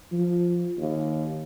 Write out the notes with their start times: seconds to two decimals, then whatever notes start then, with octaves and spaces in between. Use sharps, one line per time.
0.12 F3
0.78 D#2